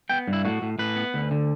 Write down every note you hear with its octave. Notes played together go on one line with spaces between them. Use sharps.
B3 G5
G2
E4
A2 F#4
A2
A2 B4
B3
D2
D3